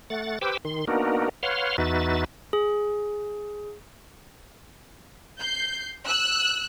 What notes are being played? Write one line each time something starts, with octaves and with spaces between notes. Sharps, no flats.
A3 F#5 A6
G4 B4 C5 G5 D6 E6
D#3 C6
A#3 B3 D4 D#4 F#4 A#4
B4 C#5 F5 F#5 C6 F6
E2 D#4 F#4 B4 E5 A6
G#4
G6 C7
E6 F#6